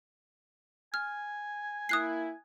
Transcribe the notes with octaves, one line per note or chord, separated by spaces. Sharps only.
G#5 F6
A#3 E4 D#6 F#6 C7